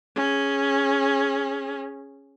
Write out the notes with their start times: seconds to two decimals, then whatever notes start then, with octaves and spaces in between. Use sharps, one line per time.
0.16 C#4 G#4